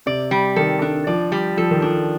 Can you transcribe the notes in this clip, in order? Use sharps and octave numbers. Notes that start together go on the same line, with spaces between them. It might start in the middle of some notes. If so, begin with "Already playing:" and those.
C3 D5
G3
D#3 A4
D4
F3 D5
G3
F3 A4
D#3
F3 D4